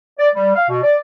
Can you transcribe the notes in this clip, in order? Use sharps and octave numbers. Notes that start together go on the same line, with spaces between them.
D5
G3
F5
B2
D5